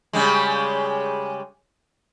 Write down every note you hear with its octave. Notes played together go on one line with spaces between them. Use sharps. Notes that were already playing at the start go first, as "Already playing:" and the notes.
C#3 G3 G#3